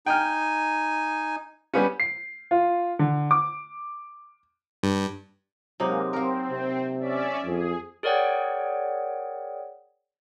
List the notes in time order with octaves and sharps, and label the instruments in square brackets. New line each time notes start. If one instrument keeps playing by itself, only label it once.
[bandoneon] D#4 G#5 [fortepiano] G5 F6
[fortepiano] G3 B3 C#4
[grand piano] C7
F4
D3
D6
[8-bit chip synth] G2
[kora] C3 F#3 D#4 [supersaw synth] G#3 A#3
[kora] A#3 A#4 [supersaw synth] C4
[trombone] C3
[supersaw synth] C#4 D5 E5
[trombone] F2 [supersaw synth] G#4
[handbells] G#4 A#4 C#5 D5 F#5 G5